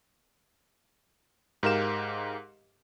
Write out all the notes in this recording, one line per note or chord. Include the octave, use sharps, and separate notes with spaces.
G#2 G4 A#4 F5 E7